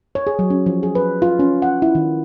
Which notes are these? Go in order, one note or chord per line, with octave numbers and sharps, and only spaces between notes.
C#5
G#4
F#3
C#4
F3
G#4
B4
F4
C#4
F#5
E4
D#3